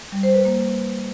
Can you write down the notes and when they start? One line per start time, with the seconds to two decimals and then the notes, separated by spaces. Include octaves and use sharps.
0.12 G3
0.23 C5
0.34 B4
0.45 A#3
0.56 B4